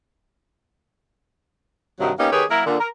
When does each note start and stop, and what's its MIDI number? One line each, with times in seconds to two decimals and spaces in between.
1.99 2.12 43
1.99 2.12 48
1.99 2.12 51
1.99 2.12 54
2.19 2.30 58
2.19 2.30 59
2.19 2.30 61
2.19 2.30 63
2.19 2.30 67
2.33 2.44 51
2.33 2.44 67
2.33 2.44 68
2.33 2.44 71
2.33 2.44 73
2.51 2.62 54
2.51 2.62 58
2.51 2.62 64
2.51 2.62 70
2.66 2.77 46
2.66 2.77 50
2.80 2.88 70